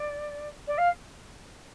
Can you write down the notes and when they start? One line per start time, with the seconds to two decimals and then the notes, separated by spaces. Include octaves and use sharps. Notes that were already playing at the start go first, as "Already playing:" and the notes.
Already playing: D5
0.67 D5
0.78 F5